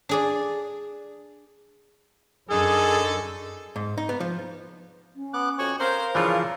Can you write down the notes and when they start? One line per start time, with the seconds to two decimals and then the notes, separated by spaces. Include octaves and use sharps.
0.09 D4 G#4 D5
2.50 F#2 D3 C#4 D#4 G#4 A4
3.76 G#2
3.98 D#4
4.09 B3
4.20 F3
5.16 C#4
5.34 B3 D6 F#6
5.59 F2 F#4 C#5 G#5 C#6
5.80 A#4 C5 F5
6.15 C#3 E3 F3 D4 F4